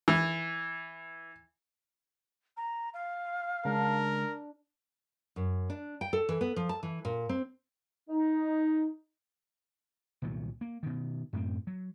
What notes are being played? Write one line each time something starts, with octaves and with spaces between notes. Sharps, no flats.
E3
A#5
F5
C#3 G#3 D4 A#4
F#2
D4
G5
A4
E3
B3
F3
A5
E3
A#2
C4
D#4
C2 A#2 D#3 F#3
A#3
B2 D#3
F#2 A2 B3 C4
F#3